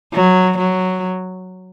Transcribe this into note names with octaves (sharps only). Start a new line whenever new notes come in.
F#3
F#3